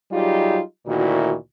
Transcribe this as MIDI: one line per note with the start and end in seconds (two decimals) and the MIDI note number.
0.12 0.60 54
0.12 0.60 55
0.12 0.60 63
0.12 0.60 65
0.12 0.60 67
0.12 0.60 68
0.87 1.34 38
0.87 1.34 46
0.87 1.34 51
0.87 1.34 64
0.87 1.34 66